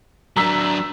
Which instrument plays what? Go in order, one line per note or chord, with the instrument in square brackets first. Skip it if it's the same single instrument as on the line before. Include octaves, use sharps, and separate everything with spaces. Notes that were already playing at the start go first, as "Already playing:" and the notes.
[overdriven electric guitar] F#3 D4 [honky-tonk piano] A#5 E6 B6